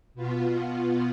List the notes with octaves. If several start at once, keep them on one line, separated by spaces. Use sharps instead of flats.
B2 B3 F4